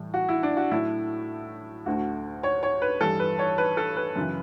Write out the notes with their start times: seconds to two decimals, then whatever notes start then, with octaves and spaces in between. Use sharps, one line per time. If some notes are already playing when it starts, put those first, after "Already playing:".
Already playing: A2 E3 G3
0.14 F#4
0.28 E4
0.43 D4
0.57 F#4
0.71 A2 F#3 A3 E4
1.86 D2 D3 A3 F#4
2.43 C#5
2.63 C#5
2.82 B4
3.01 G2 E3 G3 A4
3.20 B4
3.39 C#5
3.58 B4
3.77 A4
3.97 B4
4.16 F#2 C#3 E3